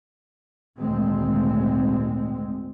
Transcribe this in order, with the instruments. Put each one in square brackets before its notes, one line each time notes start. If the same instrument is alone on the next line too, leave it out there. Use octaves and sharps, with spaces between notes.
[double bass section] G#1 D2 A#2 G#3 C4